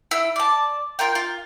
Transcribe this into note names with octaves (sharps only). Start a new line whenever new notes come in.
E4 E6
D5 A5
F4 A#4 G5
F4